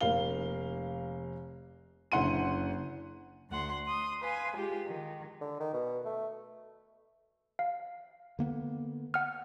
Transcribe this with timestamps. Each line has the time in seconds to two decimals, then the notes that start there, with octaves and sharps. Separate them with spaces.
0.01 F1 A#3 F5 G7
2.12 F#1 D3 E4 F#5 C6 D#7
3.49 D2 F#5 C6
3.85 C6 D#6
4.21 B4 F5 G#5 C6
4.56 G#3 F4 G4
4.86 D#3
5.41 D3
5.60 D#3
5.73 B2
6.05 A3
7.59 F5
8.39 D3 A#3 B3
9.14 F#5 F6